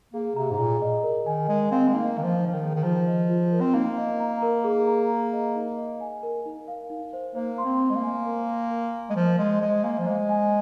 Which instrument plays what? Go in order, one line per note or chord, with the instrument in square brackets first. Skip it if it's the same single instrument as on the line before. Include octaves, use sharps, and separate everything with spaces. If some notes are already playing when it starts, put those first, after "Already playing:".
[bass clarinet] A#3 [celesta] G#4
[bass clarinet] C3 [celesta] A#5
[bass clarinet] G#2
[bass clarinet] A#2 [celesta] G#4
[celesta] D#5
A#4
[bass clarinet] D#3 [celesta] G#5
[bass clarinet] G#3 [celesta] A#4
[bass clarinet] C4 [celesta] F5
[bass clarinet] G#3
[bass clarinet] A#3 [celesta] D#4
[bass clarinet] D#3 [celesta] D#5
[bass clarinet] F3
[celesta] D#4
[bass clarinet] F3
D#3
[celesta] G#4
[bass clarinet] D#3
[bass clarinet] F3 [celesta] F4
[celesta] D#5
F4
A#4
[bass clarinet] C4
[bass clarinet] A#3 [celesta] D#4
[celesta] D#5
A#5
A#4
G#4
A#5
G#4
D#5
D#4
D#5
G#5
A#4
D#4
F5
D#4
C5
[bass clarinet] A#3 [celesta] C5
[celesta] C6
[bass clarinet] C4
[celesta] C5
[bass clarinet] G#3
A#3
[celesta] G#5
A#4
C6
A#4
F5
[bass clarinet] G#3
[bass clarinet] F3 [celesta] C5
[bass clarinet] G#3 [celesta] C6
[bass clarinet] G#3 [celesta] C5
[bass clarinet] A#3 [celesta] G#5
[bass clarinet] F3
[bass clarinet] G#3 [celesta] C5
[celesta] G#5